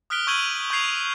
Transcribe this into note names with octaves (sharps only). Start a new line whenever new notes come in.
D#6 F6 F#6 B6 D7 G7
C#6 E6 G6 G#6 D#7 F#7
C#6 G6 G#6 C7 F7